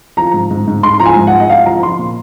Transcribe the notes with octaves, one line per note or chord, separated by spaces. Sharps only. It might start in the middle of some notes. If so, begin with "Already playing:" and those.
F3 A#5
G#2
G#2
G#2
G#2 C6
F3 A#5
G#5
G#2
F#5
F3
D#5
F3 F5
F3 A#5
F3 C6
A#2